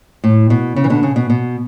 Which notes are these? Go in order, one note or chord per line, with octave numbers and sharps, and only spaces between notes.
A2
B2
C#3
E3
B2 D3
C#3
B2
B2